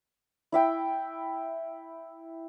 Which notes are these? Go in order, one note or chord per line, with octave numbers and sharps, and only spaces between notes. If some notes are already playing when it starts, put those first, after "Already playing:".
E4 E5 G5